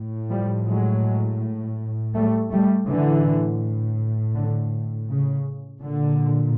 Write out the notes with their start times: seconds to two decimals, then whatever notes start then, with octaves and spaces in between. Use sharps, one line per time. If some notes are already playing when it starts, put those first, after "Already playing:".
Already playing: A2
0.30 F3 G3
0.67 F#3 G#3
2.14 G3 A3
2.51 G3 A3
2.88 A2 D3 E3
4.35 D3
5.09 C#3
5.82 A#2 D3